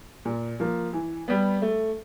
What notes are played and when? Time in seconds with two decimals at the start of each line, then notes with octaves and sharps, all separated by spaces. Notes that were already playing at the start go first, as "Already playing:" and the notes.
0.25 A#2
0.60 F3 A#3
0.93 E3
1.28 G3 B3
1.62 A3